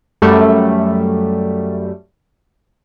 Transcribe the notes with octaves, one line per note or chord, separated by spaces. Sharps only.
F#2 G3 A3